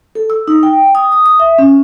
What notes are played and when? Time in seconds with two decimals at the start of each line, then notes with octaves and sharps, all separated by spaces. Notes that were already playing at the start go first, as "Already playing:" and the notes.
0.15 A4
0.30 E6
0.48 D#4
0.63 G5
0.95 D#6
1.12 D#6
1.26 D#6
1.40 E5
1.58 C#4